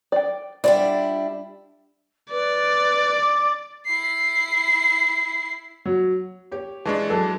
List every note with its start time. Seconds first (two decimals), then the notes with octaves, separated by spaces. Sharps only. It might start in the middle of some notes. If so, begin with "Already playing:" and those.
0.12 D5 G5
0.64 G3 D4 E4 F4 D5 F#5
2.31 B4 D5
3.16 D6
3.86 E4 C7
5.85 F#3
6.51 G4 C#5
6.85 E3 G#3 D4 A5 C#6
7.10 F#3 A4